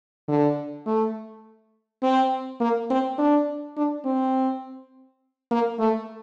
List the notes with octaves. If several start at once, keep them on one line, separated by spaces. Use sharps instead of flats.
D3
A3
C4
A#3
C4
D4
D4
C4
A#3
A3